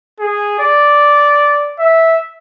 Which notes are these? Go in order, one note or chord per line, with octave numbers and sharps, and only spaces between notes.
G#4
D5
E5